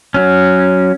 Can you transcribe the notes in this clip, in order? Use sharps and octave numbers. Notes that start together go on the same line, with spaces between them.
F#3 C#4